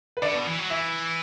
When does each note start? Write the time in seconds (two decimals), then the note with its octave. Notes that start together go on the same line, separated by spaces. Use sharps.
0.17 B4
0.22 D3 D5
0.35 B2
0.47 E3
0.59 F#3
0.70 E3 E5